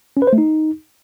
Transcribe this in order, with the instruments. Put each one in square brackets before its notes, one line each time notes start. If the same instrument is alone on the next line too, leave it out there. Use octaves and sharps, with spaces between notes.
[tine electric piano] C#4
B4
C5
A3
D#4